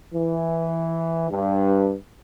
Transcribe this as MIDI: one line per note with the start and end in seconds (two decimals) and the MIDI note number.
0.13 1.27 52
1.30 1.94 43